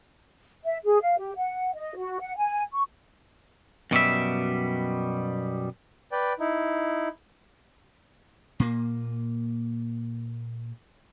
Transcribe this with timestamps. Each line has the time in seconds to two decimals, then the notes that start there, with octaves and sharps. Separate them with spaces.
0.64 E5
0.84 G#4
1.01 F5
1.19 G4
1.36 F#5
1.74 D#5
1.96 F#4
2.21 F#5
2.37 G#5
2.73 C#6
3.91 F#2 B2 G3 E5
6.12 B4 D5 G5
6.39 D#4 E4
8.60 A#2 A#3